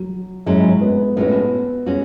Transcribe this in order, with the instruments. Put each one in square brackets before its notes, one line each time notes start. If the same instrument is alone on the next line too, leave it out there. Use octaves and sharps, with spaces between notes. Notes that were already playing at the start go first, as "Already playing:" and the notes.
Already playing: [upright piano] F#3
[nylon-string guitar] G#2 F#3 C#4 E4 [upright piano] G#3
[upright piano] B3
[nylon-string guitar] A2 G#3 C#4 F#4 [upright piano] B3
[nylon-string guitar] G#3 C#4 F#4